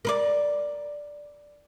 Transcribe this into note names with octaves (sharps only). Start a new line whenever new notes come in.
A#4 B4 D5